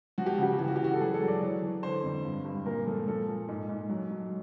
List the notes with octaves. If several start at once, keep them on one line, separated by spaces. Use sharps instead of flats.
F3 F#4
G4
F#4
C#3 G4
F#4
E3 G4
F#4
G4
E3 F#4
A4
F#3 G#4
A4
F#3
D5
E3 C#5
E3
D3 C5
F2
G2
G2
A#2 A#4
F3 A4
F3 A4
A#2
G#2
G#2
F#3
F#3